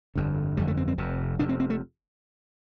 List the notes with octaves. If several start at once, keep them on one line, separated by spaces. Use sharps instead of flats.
G1 F2 D3
G1 F2 D3 G3
A3
C4
C4
F1 F2 C3
F1 F2 C3 D4
C4
C4
A3